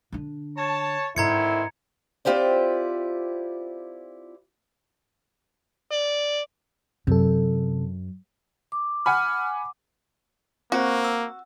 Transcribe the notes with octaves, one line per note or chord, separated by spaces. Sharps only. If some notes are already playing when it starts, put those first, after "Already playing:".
D3 D4
C#5 A5
G#2 D3 D#3 C4 E4 A#5 G#6 C#7
C4 E4 F4 G4 C5 D5
D5
F#2 C3 A4
D6
F#5 G#5 B5 F6
A#3 C4 F#4 C5
E6